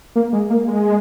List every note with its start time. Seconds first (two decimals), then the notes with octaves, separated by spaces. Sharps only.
0.16 A#3
0.33 G#3
0.50 A#3
0.68 G#3